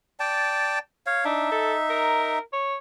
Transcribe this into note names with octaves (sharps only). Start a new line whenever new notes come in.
D5 G5 A5
C#5 F5
D4 D#4 E5
A4
A#4
C#5